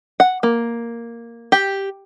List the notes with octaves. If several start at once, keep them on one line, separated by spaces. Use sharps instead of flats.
F#5
A#3
G4